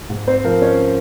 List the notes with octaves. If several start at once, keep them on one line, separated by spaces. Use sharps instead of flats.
G#2
C4 C5
F3 A#4
C#4 C#5